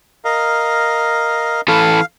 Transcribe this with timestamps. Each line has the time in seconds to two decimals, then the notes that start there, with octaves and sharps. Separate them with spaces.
0.25 A#4 D#5 F5
1.68 E3 A4 F5